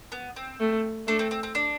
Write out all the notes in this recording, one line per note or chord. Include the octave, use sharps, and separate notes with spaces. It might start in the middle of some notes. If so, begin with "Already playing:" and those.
B3
C4
A3
A3 D4
C4
C4
C4
D4